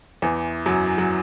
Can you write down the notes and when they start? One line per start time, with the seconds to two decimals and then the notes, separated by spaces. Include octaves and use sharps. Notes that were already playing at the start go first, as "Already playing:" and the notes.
0.22 E2 E3
0.66 F#2 F#3
0.98 F#3